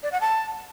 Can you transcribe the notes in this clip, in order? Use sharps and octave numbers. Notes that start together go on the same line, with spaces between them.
D5
F#5
A5